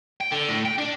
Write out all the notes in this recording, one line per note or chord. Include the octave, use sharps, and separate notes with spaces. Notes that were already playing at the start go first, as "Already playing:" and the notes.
G5
D3
A2
G5
D4